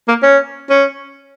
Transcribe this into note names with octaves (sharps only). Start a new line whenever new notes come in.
A#3
C#4
C#4